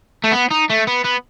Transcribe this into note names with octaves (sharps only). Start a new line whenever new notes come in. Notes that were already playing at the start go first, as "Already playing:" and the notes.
A3
B3
D#4
A3
B3
B3